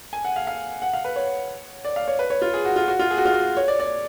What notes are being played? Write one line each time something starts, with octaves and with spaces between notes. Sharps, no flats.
G#5
F#5
F5
F5
F#5
F5
B4
C#5
D5
F5
C#5
B4
C#5
F4
G#4
F#4
F4
F#4
F4
G#4
F#4
F4
F#4
C#5
D5
D5